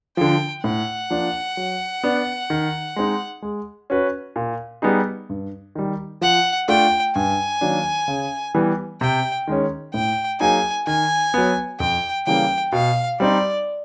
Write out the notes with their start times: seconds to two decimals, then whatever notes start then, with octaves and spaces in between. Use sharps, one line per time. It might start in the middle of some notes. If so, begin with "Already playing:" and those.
0.17 D3 F3 G5
0.64 A2 F#5
1.10 F3 A#3 D4
1.57 F#3
2.03 B3 D4
2.50 D#3
2.96 G#3 C4 D#4
3.42 G#3
3.90 C#4 F#4 B4
4.36 A#2
4.82 G3 B3 D#4 G#4
5.29 G2
5.75 D#3 G3
6.21 F3 F#5
6.68 A3 D4 F4 G5
7.15 G2 G#5
7.61 D#3 F#3 A#3 D4
8.08 C#3
8.55 E3 G3 B3
9.01 C3 G5
9.47 D#3 G#3 C#4
9.94 A2 G5
10.40 F#3 A#3 D#4 G#4 G#5
10.87 D#3 G#5
11.34 F#3 B3
11.80 F2 G5
12.26 C#3 E3 G3 A#3 G5
12.72 B2 F5
13.20 G3 C4 D#4 D5